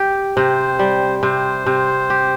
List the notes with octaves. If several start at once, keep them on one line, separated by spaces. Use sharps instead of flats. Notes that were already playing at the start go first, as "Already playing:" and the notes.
Already playing: G4
C3 C5
G3
C3 C5
C3
G4